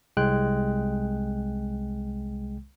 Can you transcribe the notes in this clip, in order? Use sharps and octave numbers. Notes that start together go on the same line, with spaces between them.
C2 G#3 G5 F#6